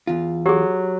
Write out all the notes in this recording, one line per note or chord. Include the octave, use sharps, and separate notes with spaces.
E2 F4
F#3 G4 G#4